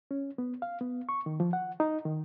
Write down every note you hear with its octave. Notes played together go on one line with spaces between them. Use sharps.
C#4
B3
F5
B3
C#6
D#3
F3
F#5
D#4
D#3